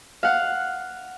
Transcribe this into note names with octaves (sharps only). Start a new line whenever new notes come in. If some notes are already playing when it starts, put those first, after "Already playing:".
F5 F#5